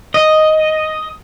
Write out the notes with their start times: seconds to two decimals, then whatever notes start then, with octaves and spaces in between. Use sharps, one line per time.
0.14 D#5